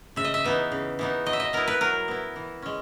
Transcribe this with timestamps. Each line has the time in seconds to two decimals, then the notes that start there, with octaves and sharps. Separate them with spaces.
0.16 C#3 E5
0.25 D#5
0.34 E5
0.44 E3 B3 D#4
0.72 C#3
0.99 E3 B3 D#4
1.26 F#3 D#5
1.33 E5
1.40 D#5
1.53 B3 E4 A#4
1.68 B4
1.81 F#3 A#4
2.08 B3 E4
2.36 E3
2.62 G#3 C#4